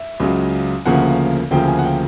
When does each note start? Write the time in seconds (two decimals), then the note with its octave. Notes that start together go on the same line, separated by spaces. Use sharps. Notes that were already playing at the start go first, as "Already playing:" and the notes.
Already playing: E5
0.20 C#2 C#3 F#3
0.85 D2 C#3 F3 A#3 F#5
1.51 D2 C#3 F3 A#3 G5
1.68 G#5
1.79 F#5
1.84 G5